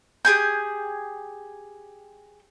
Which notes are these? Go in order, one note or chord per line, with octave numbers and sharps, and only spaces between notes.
G4 G#4 G#5 G6